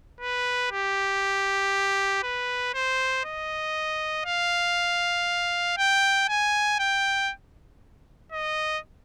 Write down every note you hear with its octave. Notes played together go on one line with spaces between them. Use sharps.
B4
G4
B4
C5
D#5
F5
G5
G#5
G5
D#5